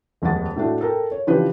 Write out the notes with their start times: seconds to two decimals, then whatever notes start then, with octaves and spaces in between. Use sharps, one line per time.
0.22 D#1 F2 G#3 F#5 A6
0.56 A2 A3 D4 F#4
0.81 A4 A#4 G5
1.11 C#5
1.27 C#3 E3 F3 D4 G4 B4